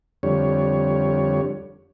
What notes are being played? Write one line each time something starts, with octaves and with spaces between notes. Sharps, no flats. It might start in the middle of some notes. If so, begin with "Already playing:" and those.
F2 D3 G3 C#5